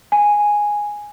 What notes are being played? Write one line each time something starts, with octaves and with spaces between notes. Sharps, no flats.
G#5